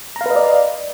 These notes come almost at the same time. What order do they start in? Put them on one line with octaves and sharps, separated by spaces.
A#5 F5 B4 D#5 D5